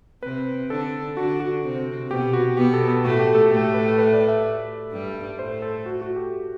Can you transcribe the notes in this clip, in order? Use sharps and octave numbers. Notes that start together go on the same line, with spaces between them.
C3 C4 B4
D3 D4 A4
D3 D4 F#4
F#4
C3 C4
B2 B3 G4
F#4
B2 B3 G4
A4
A4
A2 A3 F#4
G4
A4
A2 A3 G4
B4
B4
D5
E5
E5
G2 G3
A2 A3 C5
A4
F#4
F#4
G4